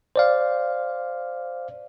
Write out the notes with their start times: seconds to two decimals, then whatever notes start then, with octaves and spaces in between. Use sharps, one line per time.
0.16 C5 D5 F5